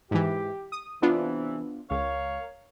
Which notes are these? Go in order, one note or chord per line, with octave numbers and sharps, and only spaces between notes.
G#2 E3 G4
D#6
C3 E3 B3 D4 F4
C#2 A#4 C#5 F5